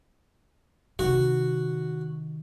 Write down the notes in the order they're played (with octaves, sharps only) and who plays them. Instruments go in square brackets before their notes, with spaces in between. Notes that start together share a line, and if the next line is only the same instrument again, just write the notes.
[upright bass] C3 D#3 [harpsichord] F#4